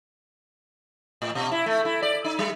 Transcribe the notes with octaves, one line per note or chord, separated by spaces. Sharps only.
A2
B2
E4
A3
E4
D5
D#4
G3